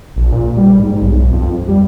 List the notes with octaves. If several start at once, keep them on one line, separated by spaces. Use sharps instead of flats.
A#1
A#2
G3
G#2
B1
F2
G3